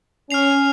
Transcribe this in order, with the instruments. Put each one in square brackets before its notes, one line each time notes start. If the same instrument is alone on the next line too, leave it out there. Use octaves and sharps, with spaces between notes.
[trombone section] C#4 [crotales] F6 C7 F7